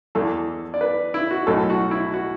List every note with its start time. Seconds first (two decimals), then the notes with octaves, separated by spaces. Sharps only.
0.15 E2 E3 A4
0.74 D5
0.81 B4
1.14 E4
1.31 F#4
1.47 B1 A2 F#3 A4
1.70 F#4
1.91 E4
2.14 F#4